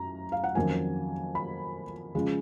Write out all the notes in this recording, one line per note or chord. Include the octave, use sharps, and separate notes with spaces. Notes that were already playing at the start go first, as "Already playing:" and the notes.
Already playing: F#2 A#5
F5
F#5
F2 D#3 F#3 A#3 C#4 G#5
B5
C#3 F3 G#3